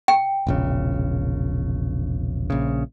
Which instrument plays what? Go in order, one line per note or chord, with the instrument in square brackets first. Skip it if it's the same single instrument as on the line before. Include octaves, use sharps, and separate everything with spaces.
[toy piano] G5
[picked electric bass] E1 A#1 C#3
A#1 C#3